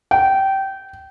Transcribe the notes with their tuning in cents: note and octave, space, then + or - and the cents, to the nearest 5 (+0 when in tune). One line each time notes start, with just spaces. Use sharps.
G5 -20